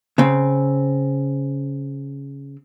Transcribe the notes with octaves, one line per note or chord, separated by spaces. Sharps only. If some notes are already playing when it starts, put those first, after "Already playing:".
C#3 C4